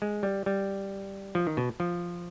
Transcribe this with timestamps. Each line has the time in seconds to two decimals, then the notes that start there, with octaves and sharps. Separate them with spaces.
0.02 G#3
0.23 G3
0.46 G3
1.35 F3
1.47 D#3
1.57 B2
1.80 F3